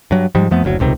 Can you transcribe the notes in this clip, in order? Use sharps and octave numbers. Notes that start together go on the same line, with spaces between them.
G2 F#3
G#2 F3 G3 G#3
F2 F3 A3 B3
F#1 D2 B2 F#3
D#1 C#2 C3 D#3